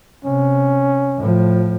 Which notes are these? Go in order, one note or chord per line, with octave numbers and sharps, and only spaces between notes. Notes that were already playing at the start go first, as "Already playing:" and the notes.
C3 C#4
A2 F3